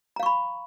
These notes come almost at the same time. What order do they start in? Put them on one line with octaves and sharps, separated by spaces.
A#5 F5 C#6 B5